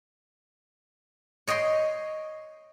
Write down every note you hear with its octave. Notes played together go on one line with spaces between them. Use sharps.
C#5 D#5 G5 C6